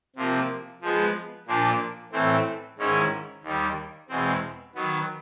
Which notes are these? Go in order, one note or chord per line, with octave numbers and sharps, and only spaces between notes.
C3 F3 A#3
F3 G#3 B3
A#2 F3 A#3 D4
A2 E3 A3 C4
G#2 D#3 G#3 C#4 E4
D#2 D#3 G3
E2 B2 G#3 C4
D#3 F#3 B3